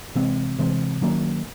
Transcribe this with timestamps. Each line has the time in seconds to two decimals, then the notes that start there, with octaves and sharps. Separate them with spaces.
0.15 C3 E3 G#3 C4
0.59 C3 E3 G#3 C4
1.01 D#3 F#3 A#3 C#4